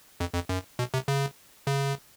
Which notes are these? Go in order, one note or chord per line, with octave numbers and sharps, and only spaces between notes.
F2
F2
F#2
B2
C3
C#3
C#3